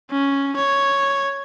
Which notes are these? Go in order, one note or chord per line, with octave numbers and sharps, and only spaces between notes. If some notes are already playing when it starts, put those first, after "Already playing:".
C#4
C#5